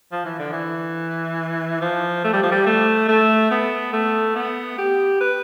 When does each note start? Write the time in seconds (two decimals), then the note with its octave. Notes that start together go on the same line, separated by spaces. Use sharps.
0.12 F3
0.25 E3
0.39 D3
0.53 E3
1.81 F3
2.24 A3
2.33 G3
2.43 F3
2.52 G3
2.66 A3
3.09 A3
3.51 B3
3.93 A3
4.36 B3
4.78 G4
5.21 B4